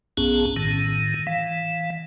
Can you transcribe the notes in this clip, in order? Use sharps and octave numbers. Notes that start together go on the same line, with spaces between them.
A#1 F#2 B3 C#4 G#4 A5
A2 D#3
E3 F5